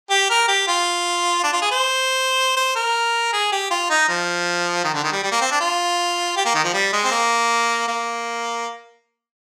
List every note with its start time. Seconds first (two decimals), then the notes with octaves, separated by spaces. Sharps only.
0.10 G4
0.30 A#4
0.48 G4
0.68 F4
1.43 D4
1.53 F4
1.62 G#4
1.71 C5
2.56 C5
2.76 A#4
3.33 G#4
3.52 G4
3.71 F4
3.90 D#4
4.08 F3
4.84 D#3
4.94 D3
5.04 D#3
5.12 G3
5.23 G3
5.31 A#3
5.41 C4
5.51 D4
5.60 F4
6.36 G4
6.45 A#3
6.54 D#3
6.64 F3
6.73 G3
6.93 G#3
7.05 C4
7.11 A#3
7.88 A#3